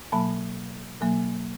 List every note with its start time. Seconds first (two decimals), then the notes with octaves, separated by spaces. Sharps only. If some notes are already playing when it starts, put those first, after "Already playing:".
0.12 B2 F#3 A#3 A5 B5
1.01 B2 F#3 A#3